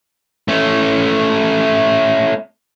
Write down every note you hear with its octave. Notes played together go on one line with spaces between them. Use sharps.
A3 C#4